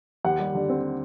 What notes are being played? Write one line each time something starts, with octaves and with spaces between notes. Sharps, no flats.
D#2 F#5
G3
D3
C4